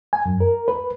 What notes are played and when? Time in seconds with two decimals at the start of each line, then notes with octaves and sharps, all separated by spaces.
0.13 G#5
0.26 F#2
0.40 A#4
0.68 B4